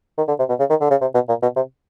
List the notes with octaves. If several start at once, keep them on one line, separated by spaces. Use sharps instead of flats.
D#3
D3
C3
B2
C#3
D#3
D3
C#3
C3
B2
A#2
B2
C3